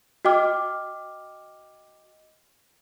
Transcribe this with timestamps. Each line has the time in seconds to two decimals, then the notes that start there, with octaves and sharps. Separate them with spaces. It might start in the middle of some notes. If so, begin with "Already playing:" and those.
0.25 F#4 D#5 G5 D6 F6